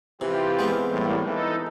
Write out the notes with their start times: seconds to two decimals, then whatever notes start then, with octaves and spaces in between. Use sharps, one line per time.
0.21 C3 E3 F4 G4
0.59 G#3 B3 C4
0.91 A2 E3 G3 A#3
1.26 E3 D#4 A4